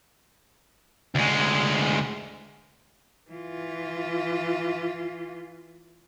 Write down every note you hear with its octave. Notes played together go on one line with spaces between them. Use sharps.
D2 G#3
E3 F4